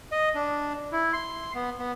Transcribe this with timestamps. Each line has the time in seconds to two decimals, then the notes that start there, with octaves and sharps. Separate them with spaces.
0.12 D#5
0.35 D4
0.92 E4
1.13 C6
1.55 B3
1.79 B3